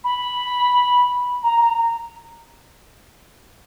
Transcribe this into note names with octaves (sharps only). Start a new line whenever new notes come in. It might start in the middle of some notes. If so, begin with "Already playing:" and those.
B5
A#5
A#5